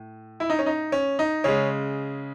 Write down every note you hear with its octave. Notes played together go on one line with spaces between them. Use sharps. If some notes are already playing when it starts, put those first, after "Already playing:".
Already playing: A2
E4
D#4
C#4
D#4
C#4
D#4
C#3 G#3 C#4